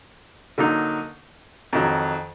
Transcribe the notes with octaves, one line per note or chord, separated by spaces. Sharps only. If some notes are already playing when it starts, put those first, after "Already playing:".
D3 F#3 A#3 D#4
F2 D#3 F#3